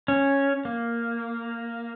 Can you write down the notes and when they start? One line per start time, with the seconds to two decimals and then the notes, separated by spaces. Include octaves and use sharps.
0.08 C#4
0.65 A#3